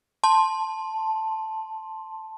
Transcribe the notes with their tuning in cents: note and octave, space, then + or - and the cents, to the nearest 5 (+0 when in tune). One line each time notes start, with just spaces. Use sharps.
A5 +0 C6 +10